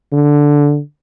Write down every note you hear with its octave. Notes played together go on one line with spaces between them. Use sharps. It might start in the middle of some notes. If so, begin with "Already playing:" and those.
D3